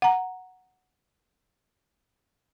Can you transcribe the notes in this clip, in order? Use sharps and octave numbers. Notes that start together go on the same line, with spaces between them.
F#5 A#5